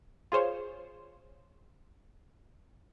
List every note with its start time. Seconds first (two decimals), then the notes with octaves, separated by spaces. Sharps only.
0.32 F4 G#4 C5 C#5